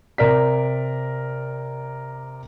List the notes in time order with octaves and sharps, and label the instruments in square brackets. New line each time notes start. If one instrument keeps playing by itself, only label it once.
[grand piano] C3 A#4 D5 B6